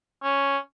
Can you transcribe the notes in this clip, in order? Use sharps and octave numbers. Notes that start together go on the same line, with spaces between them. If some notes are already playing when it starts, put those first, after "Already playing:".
C#4